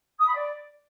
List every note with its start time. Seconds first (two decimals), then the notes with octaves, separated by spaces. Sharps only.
0.18 D#6
0.26 B5
0.34 D5